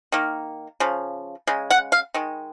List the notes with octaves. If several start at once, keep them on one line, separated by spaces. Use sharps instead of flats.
D#3 A#3
C#3 F3
C#3 G#3
F#5
F5
D#3 G#3